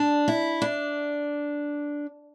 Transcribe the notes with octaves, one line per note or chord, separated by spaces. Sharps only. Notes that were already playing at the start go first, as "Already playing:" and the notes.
Already playing: D4
E4
D4